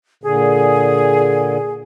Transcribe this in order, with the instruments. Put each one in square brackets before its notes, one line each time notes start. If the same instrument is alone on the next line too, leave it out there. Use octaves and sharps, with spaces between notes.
[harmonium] A#2 D3 [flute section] G#4